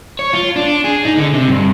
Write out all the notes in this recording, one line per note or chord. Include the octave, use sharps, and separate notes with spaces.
C#5
F4
D4
G#4
D#4
D3
C3
G2